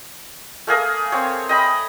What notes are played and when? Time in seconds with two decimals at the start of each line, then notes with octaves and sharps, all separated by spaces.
0.67 A3 A#3 G#4 A#4
1.12 C4 C#5
1.49 D#5 G5 B5